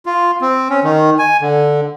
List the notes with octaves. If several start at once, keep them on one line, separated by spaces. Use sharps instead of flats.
F4
C4
C#4
D#3
G#5
D3